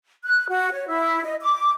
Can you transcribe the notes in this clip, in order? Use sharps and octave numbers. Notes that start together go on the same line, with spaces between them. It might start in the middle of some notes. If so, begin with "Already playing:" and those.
F#6
F#4
C#5
E4
D#5
D6